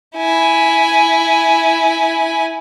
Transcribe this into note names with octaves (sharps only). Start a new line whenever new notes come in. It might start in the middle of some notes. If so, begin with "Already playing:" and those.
E4 G#5